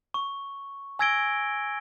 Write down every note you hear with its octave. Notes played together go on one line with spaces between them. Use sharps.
C#6
G#5 E6 G#6 A#6 D7 G7